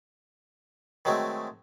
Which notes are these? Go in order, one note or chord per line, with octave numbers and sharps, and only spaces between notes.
D#3 F#3 G#3 A3 C4